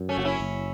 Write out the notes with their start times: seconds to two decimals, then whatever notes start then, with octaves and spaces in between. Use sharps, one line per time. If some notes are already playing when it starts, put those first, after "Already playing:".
Already playing: F#2
0.09 A3 C#4
0.17 F#1 F#4
0.25 C#4 E4
0.40 F#1